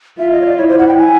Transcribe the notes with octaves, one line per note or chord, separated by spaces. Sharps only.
F4 E5
D#5
C#5
D5
E4 C#5
C5
F#5
G5
G#5